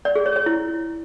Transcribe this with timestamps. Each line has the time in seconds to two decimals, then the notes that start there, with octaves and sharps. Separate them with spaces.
0.05 D5
0.16 G#4
0.26 C#5
0.36 C#5
0.46 E4